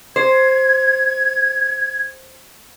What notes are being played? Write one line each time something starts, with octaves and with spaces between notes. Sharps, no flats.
C5 G#6